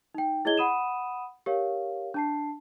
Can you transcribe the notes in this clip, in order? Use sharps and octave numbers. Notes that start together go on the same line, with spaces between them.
D#4 G5
E4 G#4 C#5 D#5 G#6 G7
F#5 B5 D#6 D#7 E7
G4 A#4 C#5 F5
D4 A5 C7